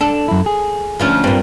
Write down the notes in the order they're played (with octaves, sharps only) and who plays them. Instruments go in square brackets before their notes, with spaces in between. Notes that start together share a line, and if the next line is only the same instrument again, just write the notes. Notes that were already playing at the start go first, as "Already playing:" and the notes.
[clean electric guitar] D4 [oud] A4
[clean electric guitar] F#2 E4
G#4
[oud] D2 F3 C#4
[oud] G2 A#2 [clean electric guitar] C4